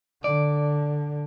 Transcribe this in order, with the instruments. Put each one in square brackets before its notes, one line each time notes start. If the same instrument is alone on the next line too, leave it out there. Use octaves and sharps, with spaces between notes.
[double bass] D3 [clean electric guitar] D5